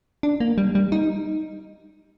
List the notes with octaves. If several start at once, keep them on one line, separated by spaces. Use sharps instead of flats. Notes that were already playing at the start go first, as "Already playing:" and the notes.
D4
A#3
G3
G3
D#4